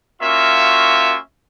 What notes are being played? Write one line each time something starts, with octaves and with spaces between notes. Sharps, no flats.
A#3 C#4 F4 F#4 E5